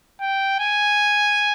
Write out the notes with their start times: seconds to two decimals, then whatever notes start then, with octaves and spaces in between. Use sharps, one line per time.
0.21 G5
0.60 G#5